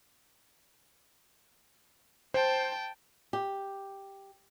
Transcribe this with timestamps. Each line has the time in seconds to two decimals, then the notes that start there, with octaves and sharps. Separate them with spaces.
2.34 C5 G5 A5
3.33 G4